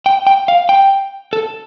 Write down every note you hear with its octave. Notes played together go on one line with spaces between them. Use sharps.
G5
G5
F5
G5
A4